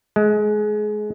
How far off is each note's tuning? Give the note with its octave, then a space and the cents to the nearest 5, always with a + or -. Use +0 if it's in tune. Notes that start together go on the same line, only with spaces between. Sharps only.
G#3 +25